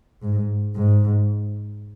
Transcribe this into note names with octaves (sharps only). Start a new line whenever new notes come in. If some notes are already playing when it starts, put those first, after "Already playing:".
G#2
G#2